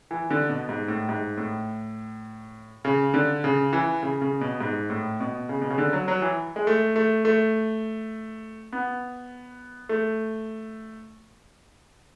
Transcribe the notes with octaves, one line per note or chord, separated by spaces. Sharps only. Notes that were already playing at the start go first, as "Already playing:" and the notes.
E3
D3
B2
G#2
A2
G#2
A2
C#3
D3
C#3
E3
C#3
C#3
B2
G#2
A2
B2
C#3
B2
C#3
D3
F#3
F#3
E3
G#3
A3
A3
A3
B3
A3